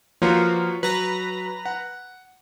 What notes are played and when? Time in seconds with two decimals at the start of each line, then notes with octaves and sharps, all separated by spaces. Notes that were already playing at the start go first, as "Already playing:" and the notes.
0.22 F3 A#3 F4 F#4 B4 C#5
0.83 F#3 B4 A#5
1.66 F#5